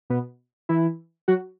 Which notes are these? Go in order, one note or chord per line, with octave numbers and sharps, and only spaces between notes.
B2 B3
E3 E4
F#3 F#4